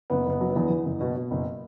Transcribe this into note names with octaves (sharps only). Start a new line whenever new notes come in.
F#1 B3
F#1 B3
F#3
B3
E2
E2
F#1
B2
B2
F#1